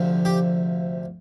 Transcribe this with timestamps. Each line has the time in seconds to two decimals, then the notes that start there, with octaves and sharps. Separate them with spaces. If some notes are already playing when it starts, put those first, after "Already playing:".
Already playing: D2 C3 F3
0.25 G4